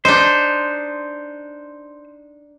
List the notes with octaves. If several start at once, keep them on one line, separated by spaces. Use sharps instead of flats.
D4 D#4 C5